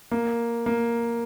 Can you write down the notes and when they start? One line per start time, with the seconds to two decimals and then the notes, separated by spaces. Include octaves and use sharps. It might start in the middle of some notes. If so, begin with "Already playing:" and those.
0.11 A#3
0.66 A#3